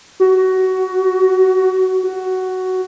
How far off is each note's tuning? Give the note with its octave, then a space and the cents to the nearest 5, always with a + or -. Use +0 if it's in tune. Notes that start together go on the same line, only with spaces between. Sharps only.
F#4 +20
F#4 +10